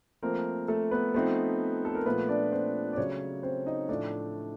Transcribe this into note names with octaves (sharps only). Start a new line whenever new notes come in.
F3 A3 A#3 C4 A#4
A3 A4
B3 B4
F3 A3 B3 C4 D#4 B4
A4
A#4
A#2 F3 A3 B3 B4
D4 D5
C4 C5
D5
C#3 F#3 A3 C#4 C#5
C4 C5
D#4 D#5
A2 F3 A3 D4 D5